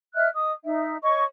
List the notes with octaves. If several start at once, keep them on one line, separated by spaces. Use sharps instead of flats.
D#5 E5 F6 F#6
D#5 D#6
D#4 E5
C#5 D#5 C#6